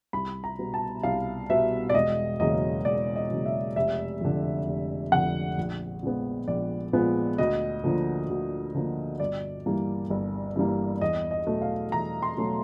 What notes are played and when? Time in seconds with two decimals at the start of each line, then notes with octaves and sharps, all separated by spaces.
0.13 C2 B5
0.44 A#5
0.59 B2 G3 B3
0.74 A5
1.03 C2 F5
1.50 B2 G3 B3 E5
1.89 D5
1.95 E1 D#5
2.40 E2 C#3 F#3 A#3 D#5
2.85 E1 D5
3.16 D#5
3.31 E2 C#3 F#3 A#3
3.46 E5
3.76 F1 E5
4.21 F2 D3
4.67 F1
5.12 F2 D3 F#5
5.58 A#1
6.03 A#2 F3 G#3 B3
6.48 A#1 D5
6.93 A#2 F3 G#3 B3
7.38 D2 D#5
7.84 D3 F3 A#3
8.30 D2
8.75 D3 F3 A#3
9.20 G1 D5
9.66 G2 E3 G3 A#3
10.10 G1
10.56 G2 E3 G3 A#3
11.01 E2 D#5
11.31 D#5
11.47 B2 F#3 A3
11.62 F5
11.92 E2 A#5
12.22 C6
12.37 B2 F#3 A3